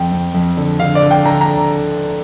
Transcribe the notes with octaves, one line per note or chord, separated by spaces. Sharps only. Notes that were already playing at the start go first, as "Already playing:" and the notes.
Already playing: F2 G5
F2
F2
D3
D3 F5
D5
D3
G5
D3 A#5
A#5